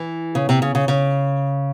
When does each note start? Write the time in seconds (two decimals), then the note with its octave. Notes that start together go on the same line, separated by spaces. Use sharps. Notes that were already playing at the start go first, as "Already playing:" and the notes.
Already playing: E3
0.35 C#3
0.49 C3
0.62 C#3
0.75 C#3
0.88 C#3